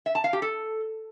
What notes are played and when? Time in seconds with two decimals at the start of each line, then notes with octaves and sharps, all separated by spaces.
0.06 E5
0.15 A5
0.24 F5
0.33 G4
0.42 A4